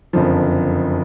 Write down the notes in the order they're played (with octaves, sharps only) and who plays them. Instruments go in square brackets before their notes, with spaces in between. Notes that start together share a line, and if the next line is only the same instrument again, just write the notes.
[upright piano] F#1 F2 D3 F3